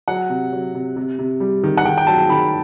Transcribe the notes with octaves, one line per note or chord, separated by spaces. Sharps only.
F#3 F#5
C3
F#3
C3
C3
C3
G3
D#3
F#5
D#3 G5
G5
F#3 A5
D#3 B5